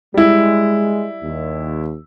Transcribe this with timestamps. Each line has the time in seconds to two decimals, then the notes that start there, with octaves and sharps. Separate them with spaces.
0.14 G3 G#3 E4
1.23 D#2